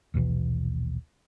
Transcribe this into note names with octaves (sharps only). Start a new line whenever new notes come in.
A#1 D#2 B2 E3